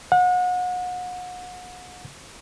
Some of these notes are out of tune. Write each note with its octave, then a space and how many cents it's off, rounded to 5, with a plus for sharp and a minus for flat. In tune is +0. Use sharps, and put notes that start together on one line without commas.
F#5 -35